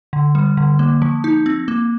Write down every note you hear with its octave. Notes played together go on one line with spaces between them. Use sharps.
D3
G3
D3
A#3
F3
D#4
C4
A#3